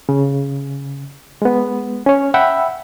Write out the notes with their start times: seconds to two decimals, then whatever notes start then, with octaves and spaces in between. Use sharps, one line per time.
0.09 C#3
1.42 G#3 B3
2.06 C#4 C#5
2.34 E5 F#5 G5 B5 E6